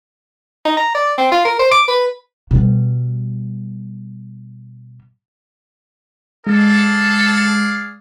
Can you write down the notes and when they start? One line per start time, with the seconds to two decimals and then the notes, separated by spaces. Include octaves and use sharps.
0.65 D#4
0.77 A#5
0.95 D5
1.18 C4
1.32 F4
1.45 A#4
1.59 C5
1.71 D6
1.88 B4
2.51 B2 G3
6.47 G#3 G#4 A4 D5 F5